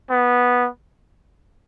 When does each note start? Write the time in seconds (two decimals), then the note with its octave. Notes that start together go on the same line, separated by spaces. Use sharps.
0.10 B3